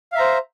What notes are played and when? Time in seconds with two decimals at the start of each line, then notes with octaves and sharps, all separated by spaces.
0.12 F5
0.15 E5
0.17 A#5
0.20 C5